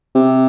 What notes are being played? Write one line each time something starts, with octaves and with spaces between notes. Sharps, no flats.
C3